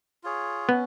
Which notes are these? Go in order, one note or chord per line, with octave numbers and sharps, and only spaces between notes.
F4 G#4 C#5
B3 C#4